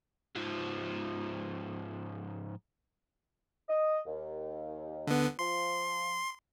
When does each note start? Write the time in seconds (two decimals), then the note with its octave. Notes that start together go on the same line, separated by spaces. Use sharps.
0.35 G#2 F3
3.69 D#5
4.06 D#2
5.07 D3 B3
5.39 F3 C6